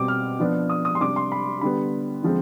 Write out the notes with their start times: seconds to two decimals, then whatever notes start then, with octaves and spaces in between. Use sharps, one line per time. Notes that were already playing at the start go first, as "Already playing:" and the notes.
Already playing: B2 G3 C4 D6
0.08 F6
0.40 F3 B3 D4
0.70 D#6
0.85 D#6
0.95 C6
1.00 C3 G3 D4 D6
1.16 C6
1.32 B5
1.61 D3 G3 B3 B5
2.23 D3 F3 G#3 C4